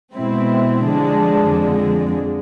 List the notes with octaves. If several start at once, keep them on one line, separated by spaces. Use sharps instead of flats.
B2 G#3 C4 E4
D3 F3 G#3 D4
F2 D3 G#3